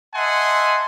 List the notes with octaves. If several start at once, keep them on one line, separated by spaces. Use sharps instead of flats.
D#5 E5 F#5 G#5 A5 C6